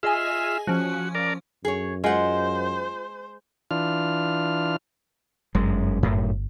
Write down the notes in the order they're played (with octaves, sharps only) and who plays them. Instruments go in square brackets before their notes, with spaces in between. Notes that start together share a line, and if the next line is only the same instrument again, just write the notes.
[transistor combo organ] F4 E5 [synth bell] G#4 D#5 G#5
[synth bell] F3 C#4 [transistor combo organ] F#4
[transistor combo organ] A#4 D5
[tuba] F#2 [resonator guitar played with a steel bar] G#4 C#5
[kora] G#3 [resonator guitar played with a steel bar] F4 F#5 [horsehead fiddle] C5
[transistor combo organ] E3 D4 F4 F6
[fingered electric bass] G1 [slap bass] F#2 G#3
[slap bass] F#2 A2